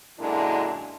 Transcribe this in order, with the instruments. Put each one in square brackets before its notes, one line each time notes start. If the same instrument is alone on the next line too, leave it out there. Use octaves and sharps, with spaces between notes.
[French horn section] F#2 A#2 D3 G#3 D4 E4